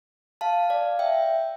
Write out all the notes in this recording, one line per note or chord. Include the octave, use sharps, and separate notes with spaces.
F5 A5
D5 F5
E5 G5